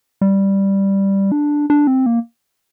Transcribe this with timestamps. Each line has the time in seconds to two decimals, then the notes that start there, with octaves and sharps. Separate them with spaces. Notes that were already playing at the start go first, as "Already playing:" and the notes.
0.21 G3
1.32 D4
1.70 D4
1.87 C4
2.06 A#3